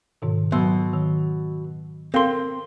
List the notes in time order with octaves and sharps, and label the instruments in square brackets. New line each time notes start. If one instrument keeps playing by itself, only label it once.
[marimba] G#2 B2 D#3
[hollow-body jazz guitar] B2 [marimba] F#3 C6 E6
[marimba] D#3
[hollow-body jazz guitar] C4 C6 [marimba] A4 A#4 F5